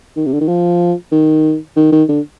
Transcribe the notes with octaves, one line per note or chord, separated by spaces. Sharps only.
D#3
C3
D3
D#3
F3
D#3
D#3
D#3
D3